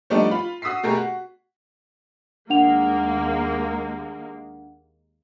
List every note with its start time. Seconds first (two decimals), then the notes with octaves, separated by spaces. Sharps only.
0.10 F3 G3 A3 B3 D4 D#4
0.31 F4 B5
0.62 F#4 D#6 E6 B6 C7
0.83 B2 A3 G4 G#4 A#4
0.96 F#4
2.50 D#2 G#3 A#3 D4 F#5 F7